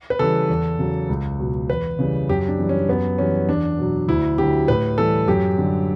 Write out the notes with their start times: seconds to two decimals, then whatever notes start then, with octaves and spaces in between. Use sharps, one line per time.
0.10 B4
0.19 C#3 E3 G3 A4
0.49 E2
0.79 C#3 F#3
1.09 C#2
1.39 B2 F#3
1.70 E2 B4
1.99 C#3 E3 G3
2.29 F#2 G4
2.48 D4
2.58 E3 G3
2.69 C#4
2.89 F#2 B3
3.18 E3 G3 C#4
3.48 E2 D4
3.78 B2 F#3
4.08 D2 E4
4.38 D3 G4
4.42 F#3
4.68 A2 B4
4.98 E3 G3 A4
5.28 F#2 G4
5.58 D3 G3